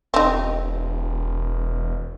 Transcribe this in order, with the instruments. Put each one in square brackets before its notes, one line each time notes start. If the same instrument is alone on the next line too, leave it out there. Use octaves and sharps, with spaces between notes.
[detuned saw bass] E1 [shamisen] C4 D#4